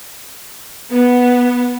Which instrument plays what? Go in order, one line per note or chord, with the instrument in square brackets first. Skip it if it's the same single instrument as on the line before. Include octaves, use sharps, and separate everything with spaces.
[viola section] B3